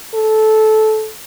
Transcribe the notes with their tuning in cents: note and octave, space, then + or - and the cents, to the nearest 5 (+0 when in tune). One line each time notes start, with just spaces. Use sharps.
A4 -15